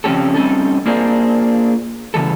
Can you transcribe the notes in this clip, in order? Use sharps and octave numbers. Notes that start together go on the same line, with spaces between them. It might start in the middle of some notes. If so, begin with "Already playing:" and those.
C#3 F3 C4 C#4 G4 A4
G3 C4 C#4 D#4 A4
A#3 D4 F4 G#4 A#4 C5
C#3 E3 G3 A4